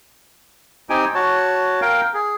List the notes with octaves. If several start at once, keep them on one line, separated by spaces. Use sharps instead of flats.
C4 D#4 G4 G5 G#5
F#4 C#5 A5
A#4 F5 G5
G#4